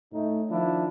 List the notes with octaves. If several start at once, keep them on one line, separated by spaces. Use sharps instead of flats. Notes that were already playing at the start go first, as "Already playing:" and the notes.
A2 D#4
D#3 F3 D4 E4